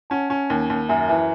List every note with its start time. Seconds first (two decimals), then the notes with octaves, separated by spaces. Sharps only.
0.10 C#4 F#5 A5
0.30 C#4
0.50 D#2
0.70 D#2
0.89 F#2 E5 G#5
1.08 E3 E5 G#5